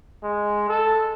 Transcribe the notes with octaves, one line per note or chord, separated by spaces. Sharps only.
G#3
A4